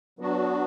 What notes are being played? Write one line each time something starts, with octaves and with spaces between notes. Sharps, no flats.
F#3 B3 D4 F#4